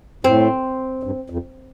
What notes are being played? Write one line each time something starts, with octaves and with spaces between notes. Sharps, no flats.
A2 C4
G2
F2